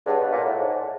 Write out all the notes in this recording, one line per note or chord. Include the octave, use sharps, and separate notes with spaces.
G2 G#4 C#5 F#5 A5
B2
A#2
A2
G#2